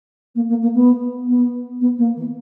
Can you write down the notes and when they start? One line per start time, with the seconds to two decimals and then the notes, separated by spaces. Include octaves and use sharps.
0.35 A#3
0.49 A#3
0.62 A#3
0.74 B3
1.28 B3
1.80 B3
1.98 A#3
2.16 E3